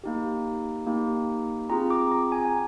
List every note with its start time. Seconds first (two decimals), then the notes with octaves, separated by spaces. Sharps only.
0.04 A#3 D#4 G4
0.87 A#3 D#4 G4
1.70 C4 F4 G#4 A#5
1.90 D6
2.12 A#5
2.32 G#5
2.45 G#5